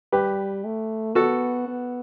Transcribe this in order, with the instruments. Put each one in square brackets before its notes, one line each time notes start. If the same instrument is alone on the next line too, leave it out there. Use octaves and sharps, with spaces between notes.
[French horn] G3 [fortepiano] G4 B4
[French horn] A3
[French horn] B3 [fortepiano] F#4 A4
[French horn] B3